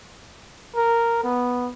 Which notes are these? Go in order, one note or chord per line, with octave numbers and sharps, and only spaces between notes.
A#4
B3